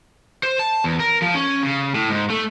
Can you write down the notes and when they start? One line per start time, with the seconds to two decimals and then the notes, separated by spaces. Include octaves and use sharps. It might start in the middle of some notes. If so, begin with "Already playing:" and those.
0.43 C5
0.59 A5
0.84 E2
1.00 A#4
1.22 F3
1.35 C#4
1.63 C#3
1.95 A2
2.10 G#2
2.30 A3